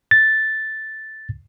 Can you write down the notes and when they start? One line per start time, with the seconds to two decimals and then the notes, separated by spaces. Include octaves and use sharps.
0.11 A6